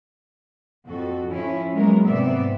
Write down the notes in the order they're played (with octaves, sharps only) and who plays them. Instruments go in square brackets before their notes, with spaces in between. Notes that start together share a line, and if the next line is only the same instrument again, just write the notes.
[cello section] F2 F#4 A4
F3 C#4 E4
F#3 G#3 A#3 B3 A#4
G#2 C3 B3 C4 D5 E5